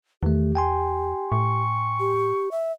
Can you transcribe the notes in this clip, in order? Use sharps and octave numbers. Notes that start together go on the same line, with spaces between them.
E2 D#3 A3 G4
G5 G#5 C6
A2 C#6
G4
E5